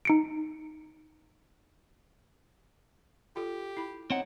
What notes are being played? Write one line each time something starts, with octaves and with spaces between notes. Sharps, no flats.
D#4 C#7 D7
F4 G4 A4
E4 B5
C4 D#4 C#5 F#5